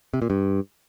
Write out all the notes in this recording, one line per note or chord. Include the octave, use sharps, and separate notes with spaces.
C3
A#2
G2